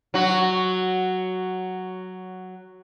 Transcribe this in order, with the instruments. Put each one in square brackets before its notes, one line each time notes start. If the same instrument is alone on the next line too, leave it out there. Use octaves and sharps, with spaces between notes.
[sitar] F#3 F#4